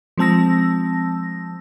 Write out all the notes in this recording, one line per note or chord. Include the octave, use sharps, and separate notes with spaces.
F3 G#3 C4 A5 E6 A#6